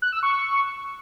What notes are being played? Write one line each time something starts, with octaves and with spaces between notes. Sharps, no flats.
F#6
E6
C#6